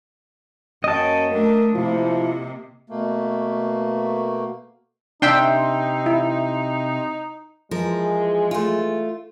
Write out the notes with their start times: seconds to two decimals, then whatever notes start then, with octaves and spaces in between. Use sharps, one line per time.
0.84 F#2 A#3 C#4 D#5 G5 A5
1.31 A3 D4 A#4
1.75 C3 F3 A#3 E4
2.90 B2 A3 A#3
5.22 C3 D4 D#4 E5 G5 C6
6.06 E4
7.71 E3 F3 G#3 A#4
8.51 A3 F4